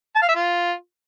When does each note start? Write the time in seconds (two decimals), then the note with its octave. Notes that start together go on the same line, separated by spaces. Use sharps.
0.15 A5
0.22 F5
0.29 E5
0.35 F4